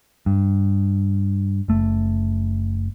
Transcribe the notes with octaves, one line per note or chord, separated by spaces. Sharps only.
G2
F#1 A3